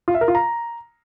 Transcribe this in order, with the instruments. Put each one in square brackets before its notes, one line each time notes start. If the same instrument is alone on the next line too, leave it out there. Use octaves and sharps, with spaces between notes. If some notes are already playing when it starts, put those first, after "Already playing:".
[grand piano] F4
E5
A#4
F4
A#5